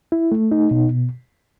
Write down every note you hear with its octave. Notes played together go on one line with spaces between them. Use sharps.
E4
A3
D#4
B2